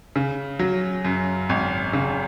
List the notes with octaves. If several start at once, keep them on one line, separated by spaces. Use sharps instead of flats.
C#3
F#3
F#2
G#1
C#3